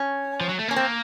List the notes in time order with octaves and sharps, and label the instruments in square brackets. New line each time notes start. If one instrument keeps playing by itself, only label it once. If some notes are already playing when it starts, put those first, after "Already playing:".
Already playing: [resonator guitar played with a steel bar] C#4
[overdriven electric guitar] F3
F#3
A3
[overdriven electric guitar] A#3 [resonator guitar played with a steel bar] C#4
[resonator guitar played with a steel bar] C4